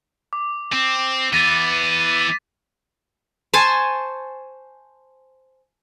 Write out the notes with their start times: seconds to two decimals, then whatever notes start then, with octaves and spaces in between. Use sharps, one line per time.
0.33 D6
0.73 C4
1.33 E3 B3 A6 A#6 D#7
3.54 C5 G#5 A5 C#6